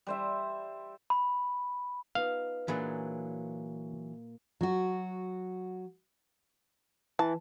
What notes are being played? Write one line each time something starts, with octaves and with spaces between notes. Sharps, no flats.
G3 C5 E5
B5
B3 D#4 F4 F5
A#2 E3 F#3 D4 F#4 G#4
F#3 F#4
E3 A5